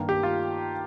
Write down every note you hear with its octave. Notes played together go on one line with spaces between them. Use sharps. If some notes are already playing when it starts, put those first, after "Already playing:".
Already playing: G2 D#3 A#3
G4
F4